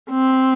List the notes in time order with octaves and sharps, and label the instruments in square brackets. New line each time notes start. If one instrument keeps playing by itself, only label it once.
[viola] C4